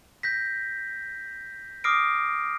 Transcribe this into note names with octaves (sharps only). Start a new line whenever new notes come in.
G6 A#6 B6
D6 D#6 F6 A#6 C7 D7